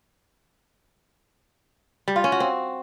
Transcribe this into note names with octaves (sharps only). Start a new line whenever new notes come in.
G3
F4
C#4
F#4
C4